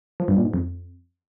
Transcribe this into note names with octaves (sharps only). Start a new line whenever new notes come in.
F3
G2
A#2
G#2
F2